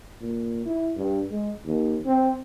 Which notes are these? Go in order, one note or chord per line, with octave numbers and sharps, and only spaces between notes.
A#2
E4
G2
G#3
D#2
C4